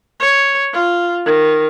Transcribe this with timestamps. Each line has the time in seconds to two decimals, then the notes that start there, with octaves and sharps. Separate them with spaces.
0.20 C#5
0.73 F4
1.26 D#3